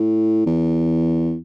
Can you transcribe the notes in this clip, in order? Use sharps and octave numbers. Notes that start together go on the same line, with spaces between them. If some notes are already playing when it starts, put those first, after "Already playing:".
Already playing: A2
E2